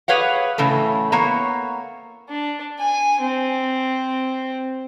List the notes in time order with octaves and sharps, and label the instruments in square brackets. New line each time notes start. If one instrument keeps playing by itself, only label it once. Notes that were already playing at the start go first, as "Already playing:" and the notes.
[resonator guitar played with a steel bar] G4 G#4 B4 C#5 F5 F#5
A2 C#3 E3 A3
A#3 B3 C#5
[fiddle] D4
G#5
C4